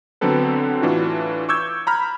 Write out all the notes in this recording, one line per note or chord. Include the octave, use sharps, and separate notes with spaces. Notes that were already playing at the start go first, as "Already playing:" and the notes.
D3 F#3 B3 C4 A4 B4
A2 E3 D4 F4 F#4
C#6 D6 E6 G6 G#6
A#5 B5 F6